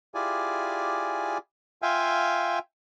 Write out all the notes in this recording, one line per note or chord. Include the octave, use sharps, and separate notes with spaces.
E4 F4 G4 G#4 D5 G#5
F4 E5 F5 G5 G#5